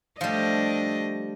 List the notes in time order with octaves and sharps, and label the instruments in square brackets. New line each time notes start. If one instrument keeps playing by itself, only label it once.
[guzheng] F3 G3 [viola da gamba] A3 D4 D#5